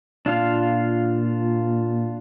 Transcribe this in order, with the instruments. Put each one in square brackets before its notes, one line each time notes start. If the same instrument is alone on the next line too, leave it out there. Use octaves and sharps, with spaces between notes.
[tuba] A#2 [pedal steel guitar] D4 F4 F5